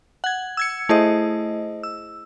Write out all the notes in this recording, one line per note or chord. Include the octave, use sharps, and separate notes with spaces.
F#5 G#6
E6 G#6 C#7
A3 E4 G#4 C5 D#5
E6